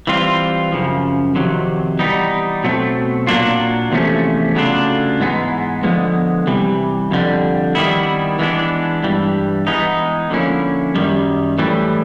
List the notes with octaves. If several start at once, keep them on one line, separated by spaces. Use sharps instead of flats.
E3 G3 C4 F4
F#2 C#3 F3
F2 C3 D#3 F#3
E3 G3 B3 D#4
B2 F#3 A3 C4
A#2 F#3 A#3 D4 F4
E2 C3 F3 A3 C#4
C#3 F#3 A3 D4 F4
G#2 E3 G#3 B3 D#4
D3 F3 G#3 B3
C3 E3 G3
F2 D3 G3
D#3 G3 B3 E4
E3 G#3 B3 D4
G2 E3 G3
E3 G#3 B3 D#4
D3 F3 A#3 C#4 E4
F#2 D#3 G3
A2 E3 G3